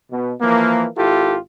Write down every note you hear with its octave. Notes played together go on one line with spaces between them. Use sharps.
B2
E3 F3 A#3
G#1 E4 F4 G4 A4